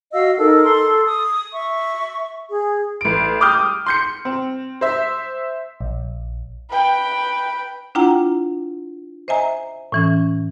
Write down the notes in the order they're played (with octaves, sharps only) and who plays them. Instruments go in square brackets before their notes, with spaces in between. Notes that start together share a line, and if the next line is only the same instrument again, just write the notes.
[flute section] F#4 D#5 F5 E6
D#4 A4 A#4
A4 C6
D#6
E5 C#6
G#4
[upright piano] A1 D7
G5 D6 D#6 F6 G6
C6 G6 C#7
C4
C5 E5
[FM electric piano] A#1
[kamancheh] B4 G5
[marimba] D4 E4 F4 F#5 G5 A#5
C5 D#5 E5 G#5 A#5
A2 E3 C#4